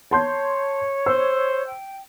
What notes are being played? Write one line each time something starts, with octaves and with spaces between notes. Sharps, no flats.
C#5 A5 C6 G6
C5 E6
G5